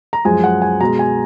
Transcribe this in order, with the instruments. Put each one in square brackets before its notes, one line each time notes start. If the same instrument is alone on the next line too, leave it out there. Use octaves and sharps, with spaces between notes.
[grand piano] A#5
F#2 F3 G#3 G#5
F#5
G#5
B2 G#3 A#5
G#5